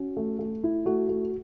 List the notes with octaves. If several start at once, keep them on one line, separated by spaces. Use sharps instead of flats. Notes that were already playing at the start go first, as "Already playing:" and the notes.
Already playing: C#4 F#4
A3
A3
E4
A3 F#4
A3